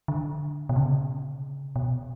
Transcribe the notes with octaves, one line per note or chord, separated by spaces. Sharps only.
D3
B2
C#3
B2